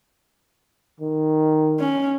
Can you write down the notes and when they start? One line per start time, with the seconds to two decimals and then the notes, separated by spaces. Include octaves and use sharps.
1.00 D#3
1.80 C#4